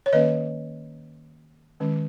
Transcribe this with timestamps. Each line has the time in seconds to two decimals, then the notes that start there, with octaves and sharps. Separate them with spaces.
0.06 C#5
0.13 D#3 A#3 C#4 B4 D#5
1.80 D#3 G#3 C#4